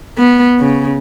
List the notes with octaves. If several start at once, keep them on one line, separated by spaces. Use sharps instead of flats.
B3
C#3